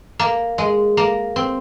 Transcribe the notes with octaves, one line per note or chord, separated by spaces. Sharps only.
A#3
G#3
A#3
C4